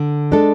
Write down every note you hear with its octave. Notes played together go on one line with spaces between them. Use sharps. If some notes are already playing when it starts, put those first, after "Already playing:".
Already playing: D3
G#3 D4 A4